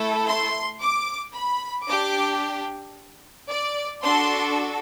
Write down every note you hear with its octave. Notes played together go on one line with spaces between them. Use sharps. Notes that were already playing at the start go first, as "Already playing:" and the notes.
Already playing: A3 E4 A4
C6
D6
B5
D4 G4 D6
D5
D4 F#4 A4 C6